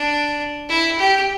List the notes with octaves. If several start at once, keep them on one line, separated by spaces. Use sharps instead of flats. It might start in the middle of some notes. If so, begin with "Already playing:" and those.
Already playing: D4
E4
G4